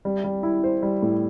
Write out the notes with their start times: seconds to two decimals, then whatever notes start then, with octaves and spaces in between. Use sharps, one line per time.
0.05 G3
0.24 G3
0.43 E4
0.64 C5
0.83 G3
1.02 A2